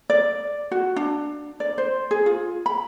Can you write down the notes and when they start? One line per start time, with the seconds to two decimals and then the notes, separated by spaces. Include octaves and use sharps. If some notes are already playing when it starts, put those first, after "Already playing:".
0.10 D5
0.71 F#4
0.96 D4
1.60 D5
1.78 C5
2.11 G#4
2.26 F4
2.66 B5